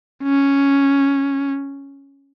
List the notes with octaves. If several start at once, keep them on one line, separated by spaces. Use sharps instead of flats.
C#4